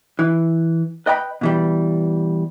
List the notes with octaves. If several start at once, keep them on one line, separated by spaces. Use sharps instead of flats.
E3
B4 D#5 G5 A#5 B5
B2 E3 G3